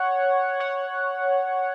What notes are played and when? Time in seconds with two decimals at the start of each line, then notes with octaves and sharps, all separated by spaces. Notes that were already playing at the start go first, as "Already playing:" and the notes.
Already playing: C#5 F#5
0.60 C#5 F#5